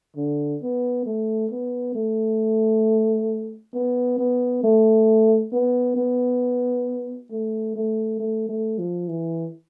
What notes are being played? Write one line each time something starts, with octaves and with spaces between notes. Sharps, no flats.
D3
B3
A3
B3
A3
B3
B3
A3
B3
B3
A3
A3
A3
A3
F3
E3